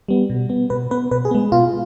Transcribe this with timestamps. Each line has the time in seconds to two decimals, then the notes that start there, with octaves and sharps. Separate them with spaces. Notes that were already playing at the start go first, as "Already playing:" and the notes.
0.08 G3 B3
0.30 B2
0.50 B3
0.70 B2 B4
0.91 B3 B4
1.11 B2 B4
1.25 G#4
1.31 G#3 B3
1.52 B2 F4